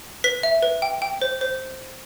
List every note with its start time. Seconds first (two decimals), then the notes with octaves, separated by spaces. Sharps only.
0.24 B4 B6
0.43 E5
0.63 B4
0.82 G5
1.02 G5
1.22 C5
1.41 C5